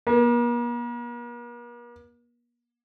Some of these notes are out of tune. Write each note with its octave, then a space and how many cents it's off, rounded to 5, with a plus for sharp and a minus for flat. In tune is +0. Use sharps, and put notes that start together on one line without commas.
A#3 +45